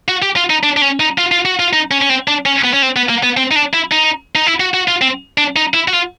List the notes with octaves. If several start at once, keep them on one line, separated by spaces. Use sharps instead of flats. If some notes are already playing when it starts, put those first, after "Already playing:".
F#4
G4
F4
D#4
D4
D4
C#4
D#4
F4
F4
F#4
F4
D#4
C#4
C#4
C4
D4
C#4
B3
C#4
C4
B3
A#3
B3
C4
D#4
D4
E4
D#4
D#4
E4
F#4
F#4
F4
C4
D4
D#4
E4
F#4
F4